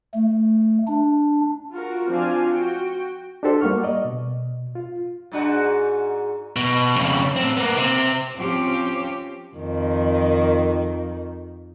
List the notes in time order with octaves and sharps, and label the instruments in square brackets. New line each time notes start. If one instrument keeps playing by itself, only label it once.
[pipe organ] A3
D4
[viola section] F4 F#4 A#4
F3 C4 D4 F5 G#5
F#4 G5
[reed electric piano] D4 D#4 F#4 G4 A4 C5
G3 A#3 F#5 C#6 F6
D5 D#5
B2
F4
[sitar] G#2 D4 F#4
[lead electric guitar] B2
F2 C#3
A2 C4
A#3 B3
C3 C4
[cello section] F3 C4 C#4 G4
[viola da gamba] F2 D#3